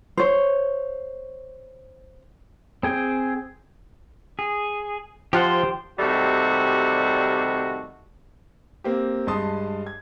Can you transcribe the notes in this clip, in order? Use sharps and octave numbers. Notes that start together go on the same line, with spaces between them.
C5 C#5
C4 G#4 G5
G#4
F3 F4 G4 C5 F#5
C3 D#3 G3 A3 F#4
A#3 C4 G4
G2 G#3 A5 C6 D#6
G#6